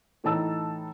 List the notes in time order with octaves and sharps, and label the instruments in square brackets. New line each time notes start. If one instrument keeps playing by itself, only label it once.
[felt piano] A2 E3 D#4 A5 E6